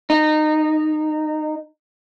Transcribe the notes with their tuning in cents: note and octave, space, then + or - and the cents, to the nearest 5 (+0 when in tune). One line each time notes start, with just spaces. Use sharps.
D#4 -20